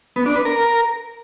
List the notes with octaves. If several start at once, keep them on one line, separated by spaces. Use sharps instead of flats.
B3
D4
B4
A#4